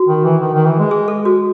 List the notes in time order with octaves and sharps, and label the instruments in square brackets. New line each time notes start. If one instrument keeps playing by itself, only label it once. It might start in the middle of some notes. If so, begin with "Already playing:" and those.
Already playing: [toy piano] F#4
[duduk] D#3
E3
D#3
D#3
E3
G#3
[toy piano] G#4
A4
F#4